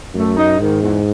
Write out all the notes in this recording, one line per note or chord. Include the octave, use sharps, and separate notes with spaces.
F#2 A3
D#4
G#2 D#3
E2